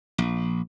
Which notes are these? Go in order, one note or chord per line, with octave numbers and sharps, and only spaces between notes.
A#1